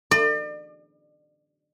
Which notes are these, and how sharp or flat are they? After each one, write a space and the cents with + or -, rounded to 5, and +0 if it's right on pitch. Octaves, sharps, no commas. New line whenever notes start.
D5 +40